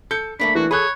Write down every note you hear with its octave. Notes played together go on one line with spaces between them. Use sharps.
A4 G6 C#7
A3 A#3 D4 B5
E3 F#4
G#4 A4 C#5 B5 F#6